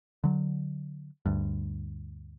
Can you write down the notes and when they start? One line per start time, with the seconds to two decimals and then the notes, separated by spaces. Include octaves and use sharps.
0.24 D3 F#3
1.26 D2 G2